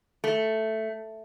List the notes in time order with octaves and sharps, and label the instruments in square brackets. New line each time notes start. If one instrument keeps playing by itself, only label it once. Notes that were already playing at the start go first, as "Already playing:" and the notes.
[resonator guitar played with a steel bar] A3